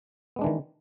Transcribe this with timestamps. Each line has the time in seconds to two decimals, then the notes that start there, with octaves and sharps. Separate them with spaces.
0.36 B3
0.39 G#3
0.41 D4
0.44 E3
0.46 D#3